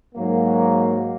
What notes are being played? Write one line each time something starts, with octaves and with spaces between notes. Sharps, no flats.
G#2 F#3 A#3